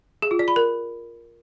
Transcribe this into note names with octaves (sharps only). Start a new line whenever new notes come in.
G#4
F4
D5
B5
A#4